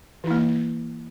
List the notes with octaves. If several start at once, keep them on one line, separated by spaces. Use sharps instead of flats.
E3 A#3 E4